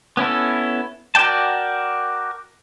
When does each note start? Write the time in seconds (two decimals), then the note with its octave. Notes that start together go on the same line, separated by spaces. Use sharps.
0.17 B3 C#4 E4 A4
1.15 F#4 A#4 D5 G5 A5